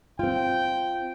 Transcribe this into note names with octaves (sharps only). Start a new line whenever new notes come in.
C4 F4 G5